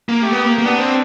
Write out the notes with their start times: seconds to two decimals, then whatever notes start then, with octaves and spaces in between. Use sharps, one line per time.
0.09 A#3
0.22 A3 G4
0.33 B3
0.44 A#3
0.58 A#3
0.65 B3 D4
0.79 C4